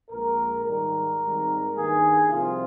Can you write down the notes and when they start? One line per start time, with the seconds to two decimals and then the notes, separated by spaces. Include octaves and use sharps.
0.10 A#1 A#2 G#3 A#4
0.65 G#2 D#3 G3 A#4
1.21 G#1 G#2 D#3 G3
1.76 G2 D#3 A#3 G#4
2.31 C2 C3 F3 C4 F4